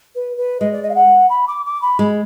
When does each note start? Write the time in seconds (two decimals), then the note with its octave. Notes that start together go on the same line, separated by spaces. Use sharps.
0.15 B4
0.37 B4
0.60 G#3 D#5
0.72 D5
0.83 D#5
0.89 F5
0.95 F#5
1.30 B5
1.47 D6
1.65 D6
1.82 B5
1.99 G#3